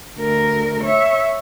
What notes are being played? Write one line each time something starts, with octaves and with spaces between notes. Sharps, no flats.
D2 A#4
C#5 E5